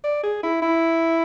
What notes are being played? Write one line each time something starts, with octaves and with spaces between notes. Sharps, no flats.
D5
G#4
E4
E4